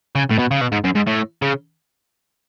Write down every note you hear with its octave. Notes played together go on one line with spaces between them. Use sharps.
C#3
A2
B2
C#3
B2
G#2
F#2
G#2
A2
C#3